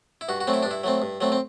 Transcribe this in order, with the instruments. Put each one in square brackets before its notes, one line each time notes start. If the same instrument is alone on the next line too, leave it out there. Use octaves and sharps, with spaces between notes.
[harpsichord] E4
G2 F#4
F#4
F#3 A3 C4
E4
G2 D4
E4
F#3 A3 C4
G2
F#3 A3 C4
C4